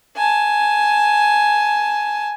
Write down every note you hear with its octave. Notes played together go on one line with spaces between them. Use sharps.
G#5 A5